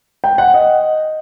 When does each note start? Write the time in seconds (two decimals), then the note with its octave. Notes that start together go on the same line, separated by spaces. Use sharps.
0.24 G5
0.38 F#5
0.54 D#5